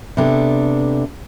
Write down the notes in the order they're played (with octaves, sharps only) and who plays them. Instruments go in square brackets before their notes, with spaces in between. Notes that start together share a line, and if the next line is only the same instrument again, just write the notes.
[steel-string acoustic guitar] C3 B3 D4 A4